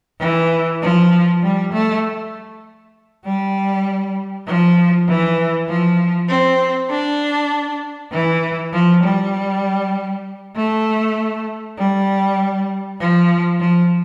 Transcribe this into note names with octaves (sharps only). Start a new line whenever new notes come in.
E3
F3
G3
A3
G3
F3
E3
F3
C4
D4
E3
F3
G3
A3
G3
F3
F3